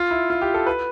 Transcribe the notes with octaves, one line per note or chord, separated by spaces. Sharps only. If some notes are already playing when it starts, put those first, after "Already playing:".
Already playing: F4
E4
F4
G4
A4
B4